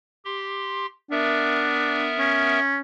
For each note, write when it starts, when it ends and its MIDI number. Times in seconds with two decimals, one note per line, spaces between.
0.25 0.86 67
0.25 0.86 84
1.11 2.59 59
1.11 2.11 62
1.11 2.59 70
1.11 2.59 76
2.19 2.80 61